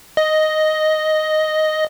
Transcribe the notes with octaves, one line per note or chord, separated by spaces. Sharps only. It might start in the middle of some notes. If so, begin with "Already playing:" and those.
D#5